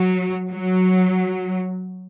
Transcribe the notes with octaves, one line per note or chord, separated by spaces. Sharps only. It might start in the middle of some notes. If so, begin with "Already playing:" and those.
Already playing: F#3
F#3